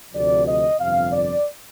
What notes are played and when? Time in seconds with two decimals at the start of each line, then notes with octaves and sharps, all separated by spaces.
0.13 D2 C3 F3 D5
0.47 D#5
0.79 G1 F2 C3 F5
1.11 D5